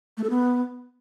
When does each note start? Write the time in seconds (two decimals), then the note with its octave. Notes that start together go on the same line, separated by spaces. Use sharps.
0.17 A3
0.24 A4
0.30 B3